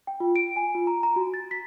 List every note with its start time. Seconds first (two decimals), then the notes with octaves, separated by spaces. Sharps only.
0.07 G5
0.20 F4
0.36 D7
0.56 G#5
0.75 F4
0.87 A#5
1.03 A#5
1.16 F#4
1.34 A6
1.51 B6